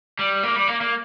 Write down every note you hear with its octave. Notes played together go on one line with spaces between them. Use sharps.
G3
A#3
G3
A#3
A#3